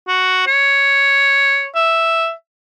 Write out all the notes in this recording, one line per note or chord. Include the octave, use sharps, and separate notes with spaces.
F#4
C#5
E5